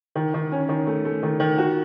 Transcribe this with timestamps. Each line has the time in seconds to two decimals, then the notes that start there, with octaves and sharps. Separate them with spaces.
0.15 D#3
0.34 D#3
0.52 C#4
0.69 D#3
0.87 A3
1.05 A3
1.23 D#3
1.40 D#3
1.58 F#4